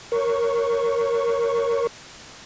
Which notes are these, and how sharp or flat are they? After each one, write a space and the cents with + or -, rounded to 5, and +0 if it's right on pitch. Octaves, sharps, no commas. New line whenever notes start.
A#4 +0 C#5 +0 C#6 +5